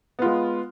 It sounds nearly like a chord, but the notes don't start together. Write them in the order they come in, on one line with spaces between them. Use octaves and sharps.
B3 F4 G#3